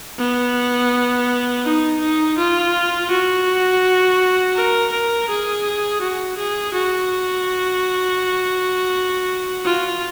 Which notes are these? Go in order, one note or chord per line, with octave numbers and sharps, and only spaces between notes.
B3
D#4
D#4
F4
F#4
A#4
A#4
G#4
F#4
G#4
F#4
F4